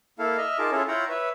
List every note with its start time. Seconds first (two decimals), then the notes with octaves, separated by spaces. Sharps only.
0.19 A#3 E4 A4 F5
0.38 D#5 E5 F6
0.59 D#4 F4 G#4 A#4 A5 D6
0.72 C#4 E4 F4 G#4 A4 C#5
0.88 E4 F4 C#5 F#5 G5 A#5
1.09 B4 C#5 E5